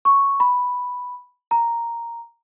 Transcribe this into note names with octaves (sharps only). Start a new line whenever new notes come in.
C#6
B5
A#5